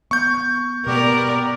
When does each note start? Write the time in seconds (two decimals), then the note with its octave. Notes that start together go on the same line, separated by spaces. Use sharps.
0.11 B3 C#6 G6
0.86 B2 B3 G4 A#4 D5